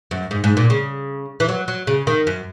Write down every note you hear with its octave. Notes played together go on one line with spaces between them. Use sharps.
F#2
G#2
G#2
A#2
C#3
E3
F#3
F#3
C#3
D#3
F#2